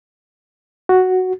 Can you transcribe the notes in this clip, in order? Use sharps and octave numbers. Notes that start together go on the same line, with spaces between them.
F#4